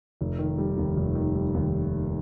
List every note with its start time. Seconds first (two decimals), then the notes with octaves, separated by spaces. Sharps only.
0.21 F1
0.39 D#3
0.58 G3
0.77 D#2
0.96 F1
1.15 D#3
1.35 G3
1.54 D#2